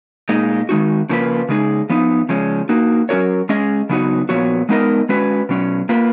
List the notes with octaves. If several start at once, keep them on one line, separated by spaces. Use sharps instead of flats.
A#2 G#3 D#4
D#3 G#3 D#4 F#4
C#3 F3 A#3 F4 B4
C#3 G#3 D#4 G#4
F3 B3 D#4
C#3 F3 G#3 C#4
A#3 D#4 F#4
F#3 C#4 F#4 A#4 C#5
G#3 C#4 G#4 D#5
C#3 F#3 B3 D#4 F#4
A#2 F3 B3 F#4 C#5
G#3 B3 D#4 A#4 D#5
G#3 C#4 F#4 B4
B2 F#3 C#4
A#3 F4 B4